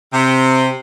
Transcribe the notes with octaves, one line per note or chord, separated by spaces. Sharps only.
C3